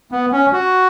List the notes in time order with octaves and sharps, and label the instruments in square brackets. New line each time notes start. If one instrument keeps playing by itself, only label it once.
[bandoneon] B3
C#4
F#4